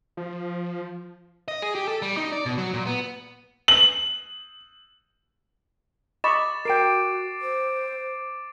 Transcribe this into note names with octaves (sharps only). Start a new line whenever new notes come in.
F3
D#5
G#4
G4
A4
G3
D#4
D5
B2
F#3
A#2
B3
F#7
D#5 B5 C#6 D6 A6 E7
F#4 A#4 G5 C7 D7
C5